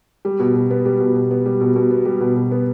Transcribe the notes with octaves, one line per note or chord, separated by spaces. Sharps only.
G3
B2
B2
B3
G3
B2
B2
B3
G3
B2
B2
B3
G3
B2
B2
B3